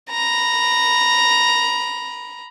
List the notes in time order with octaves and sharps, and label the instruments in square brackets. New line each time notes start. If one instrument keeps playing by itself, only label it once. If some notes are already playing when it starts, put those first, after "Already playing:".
[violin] A#5 B5